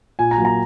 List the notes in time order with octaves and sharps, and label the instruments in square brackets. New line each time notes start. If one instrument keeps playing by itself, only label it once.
[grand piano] A#2 G#5
A#5
F#3 A#3
A#5